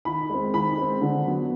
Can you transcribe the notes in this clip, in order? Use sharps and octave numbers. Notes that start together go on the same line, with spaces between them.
D#3 B5
G#3 C4
D#3 B5
G#3 C4
D3
F#3 B3